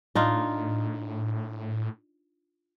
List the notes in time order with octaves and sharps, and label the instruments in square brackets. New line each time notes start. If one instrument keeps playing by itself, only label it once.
[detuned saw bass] A2 [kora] D4 D#4 F4